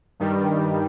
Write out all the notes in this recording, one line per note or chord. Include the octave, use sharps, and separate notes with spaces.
G2 D#3 G3